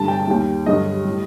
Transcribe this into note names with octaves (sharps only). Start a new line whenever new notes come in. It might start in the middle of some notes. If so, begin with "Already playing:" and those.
Already playing: G2 D3 G3 A5
G5
A5
D#2 D#3 G3 G5
G2 D3 F#3 D#5
A2 G3